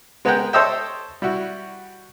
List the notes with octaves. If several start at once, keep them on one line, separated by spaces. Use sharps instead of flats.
G#3 B3 G#4 A#4 F#5 G5
A4 C5 C#5 D#5 E5 G5
G3 E4 F#4